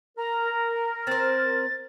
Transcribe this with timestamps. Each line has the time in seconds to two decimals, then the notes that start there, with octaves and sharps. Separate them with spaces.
0.18 A#4 A#5
1.07 C4 C5 A6